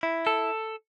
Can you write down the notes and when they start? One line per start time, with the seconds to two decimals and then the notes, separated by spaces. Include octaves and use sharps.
0.03 E4
0.27 A4